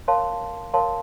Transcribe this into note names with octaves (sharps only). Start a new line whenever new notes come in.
A#4 C#5 F5 A5 C6
A#4 C#5 F5 A5 C6